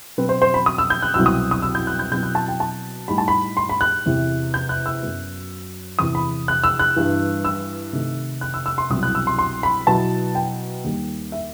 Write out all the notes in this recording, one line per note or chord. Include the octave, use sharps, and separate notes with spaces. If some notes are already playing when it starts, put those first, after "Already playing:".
B2 F#3 C4 B4
C5
C5
B5
D#6
E6
G6
F#6
C2 B2 F#3 C4 E4 E6
D#6
D#6
E6
G6
F#6
G6
B2 F#3 C4 E4 G6
F#6
A5
G5
A5
A2 G3 D#4 B5
A5
B5
C6
B5
F#6
E2 C3 E3
G6
F#6
E6
F#2 F#3 B3
E2 C3 E3 D#6
B5
F#6
E6
F#6
G2 E3 G3
E6
C3 D#3 A3 D#4
F#6
E6
E6
C6
C2 B2 F#3 C4 E4 D#6
F#6
E6
C6
C6
B5
B2 F#3 B3 E4 A5
G5
D#2 D#3 G3
E5